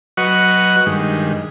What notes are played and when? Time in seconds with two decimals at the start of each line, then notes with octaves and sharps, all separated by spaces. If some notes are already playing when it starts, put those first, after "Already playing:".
0.17 F#3 F#4 B4 D#5 F#5 C#6
0.86 G2 D#3 G#3